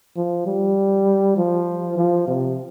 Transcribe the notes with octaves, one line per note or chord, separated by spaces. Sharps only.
F3
G3
F3
F3
C3